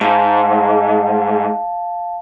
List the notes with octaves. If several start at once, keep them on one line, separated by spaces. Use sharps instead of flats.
G#2 F5 A5